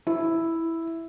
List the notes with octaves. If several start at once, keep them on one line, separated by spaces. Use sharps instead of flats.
E4